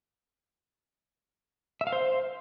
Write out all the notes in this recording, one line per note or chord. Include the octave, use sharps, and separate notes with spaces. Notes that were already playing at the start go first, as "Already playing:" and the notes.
E5
F5
C5